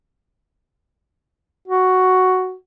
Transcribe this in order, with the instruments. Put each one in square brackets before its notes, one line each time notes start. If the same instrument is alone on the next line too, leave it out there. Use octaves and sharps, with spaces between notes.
[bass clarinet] F#4